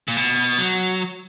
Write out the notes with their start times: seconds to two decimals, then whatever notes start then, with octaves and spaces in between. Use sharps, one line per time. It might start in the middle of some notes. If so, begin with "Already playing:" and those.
0.08 A#2
0.17 B2
0.58 F#3